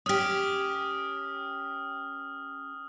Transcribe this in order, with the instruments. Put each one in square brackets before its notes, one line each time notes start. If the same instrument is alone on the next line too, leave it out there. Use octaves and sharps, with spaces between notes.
[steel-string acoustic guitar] C#4 G4 [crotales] D#6 F6